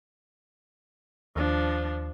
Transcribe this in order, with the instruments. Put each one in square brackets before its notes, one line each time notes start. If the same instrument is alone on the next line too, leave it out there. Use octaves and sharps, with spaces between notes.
[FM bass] D#2 [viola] F3 D4